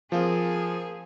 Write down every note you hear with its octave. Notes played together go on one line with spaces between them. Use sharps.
F3 A#3 C4 G#4